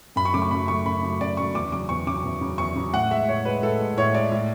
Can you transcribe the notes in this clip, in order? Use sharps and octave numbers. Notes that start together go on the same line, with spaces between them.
F#2 B5
C#6
C#3 F#3 A3 D6
C#6
F#2 B5
C#3 F#3 A3 C#6
F#2 B5
C#3 F#3 A3
F#2 D5
C#3 F#3 A3 C#6
E2 D6
C#3 F#3 D6
E2 C#6
C#3 F#3 D6
E2
C#3 F#3
E2 C#6
C#3 F#3
A2 F#5
G#3 E5
A2 C#5
G#3 B4
A2 A4
G#3
A2 C#5
G#3 D5
A2